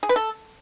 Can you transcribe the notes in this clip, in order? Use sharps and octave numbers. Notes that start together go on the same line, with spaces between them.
G#4
B4
A4